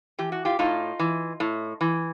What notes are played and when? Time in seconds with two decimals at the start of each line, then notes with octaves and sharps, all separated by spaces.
0.19 E3 G4
0.32 F#4
0.45 F4 G4
0.59 A2 D#4 F4
0.99 E3
1.40 A2
1.81 E3